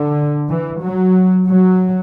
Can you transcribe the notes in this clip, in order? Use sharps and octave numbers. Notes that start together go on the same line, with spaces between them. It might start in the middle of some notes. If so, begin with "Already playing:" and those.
Already playing: D3
E3
F#3
F#3